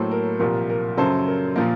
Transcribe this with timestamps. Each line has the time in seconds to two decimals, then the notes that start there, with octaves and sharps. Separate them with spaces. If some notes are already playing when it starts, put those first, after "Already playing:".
Already playing: A2 F#3 A#3 A4 C5
0.11 A#4
0.39 C2 A#2 F3 A#3 A#4
0.70 A#4
0.97 F#2 C#3 F#3 A4 C5
1.27 A#4
1.56 A#2 F3 A#3 A#4